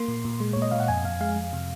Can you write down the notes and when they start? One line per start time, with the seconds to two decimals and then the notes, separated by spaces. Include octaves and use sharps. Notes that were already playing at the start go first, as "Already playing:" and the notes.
Already playing: A#3 C6
0.08 A#2
0.25 A#2
0.40 G#3
0.53 A#2 C#5
0.62 D#5
0.71 A#2 F5
0.80 F#5
0.88 F2 G#5
1.04 F2 F5
1.21 G#3 F5
1.36 F2
1.53 C3